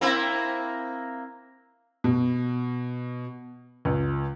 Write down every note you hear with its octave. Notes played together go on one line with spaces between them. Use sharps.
A#3 C4 E4
B2
C#2